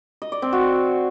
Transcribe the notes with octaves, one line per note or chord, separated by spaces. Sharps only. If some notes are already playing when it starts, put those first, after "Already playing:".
D#5
D5
C4
F#4